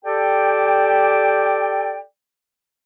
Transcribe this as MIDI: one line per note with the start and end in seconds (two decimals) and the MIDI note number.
0.05 1.99 67
0.05 1.99 69
0.05 1.99 74
0.05 1.99 79